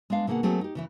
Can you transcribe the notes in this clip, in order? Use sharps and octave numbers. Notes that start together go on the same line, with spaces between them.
G#3 B3 D4 F5
B2 D3 A#3 G#4 F#5
F#3 A3 A#3 C4 F#4 G#4
D#4 G4
C#3 E3 E4